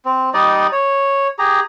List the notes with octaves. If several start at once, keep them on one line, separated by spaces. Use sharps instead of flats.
C4
G3 D#4 D5 D#5
C#5
G4 G#4 A#5